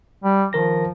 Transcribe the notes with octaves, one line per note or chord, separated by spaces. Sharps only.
G3
D#3 F3 A#4 A#6